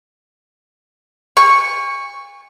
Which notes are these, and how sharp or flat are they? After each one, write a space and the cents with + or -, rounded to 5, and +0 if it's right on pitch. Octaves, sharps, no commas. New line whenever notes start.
G#5 -45 C#6 +0